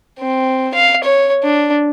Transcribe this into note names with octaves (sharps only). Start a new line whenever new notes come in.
C4
F5
C#5
D4